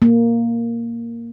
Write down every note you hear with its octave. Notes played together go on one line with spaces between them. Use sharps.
A#3